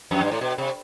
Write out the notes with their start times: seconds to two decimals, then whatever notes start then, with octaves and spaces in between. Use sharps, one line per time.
0.11 F2
0.21 G2
0.31 A2
0.41 B2
0.58 C3